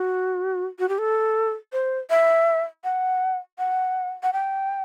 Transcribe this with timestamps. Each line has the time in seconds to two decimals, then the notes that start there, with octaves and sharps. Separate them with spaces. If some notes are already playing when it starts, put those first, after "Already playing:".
Already playing: F#4
0.79 F#4
0.89 G4
0.98 A4
1.73 C5
2.10 E5
2.84 F#5
3.59 F#5
4.23 F#5
4.33 G5